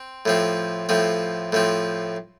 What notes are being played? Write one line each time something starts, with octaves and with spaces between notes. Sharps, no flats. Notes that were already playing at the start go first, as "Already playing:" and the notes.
Already playing: C4
A2 F3 C4
A2 F3 C4
A2 F3 C4